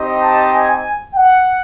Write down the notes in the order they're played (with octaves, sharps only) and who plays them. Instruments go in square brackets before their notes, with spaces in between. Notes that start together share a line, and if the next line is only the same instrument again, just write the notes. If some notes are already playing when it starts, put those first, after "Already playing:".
Already playing: [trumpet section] C4 D#4 G4 C5 D#5
[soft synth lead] A5
G#5
G#5
G5
F#5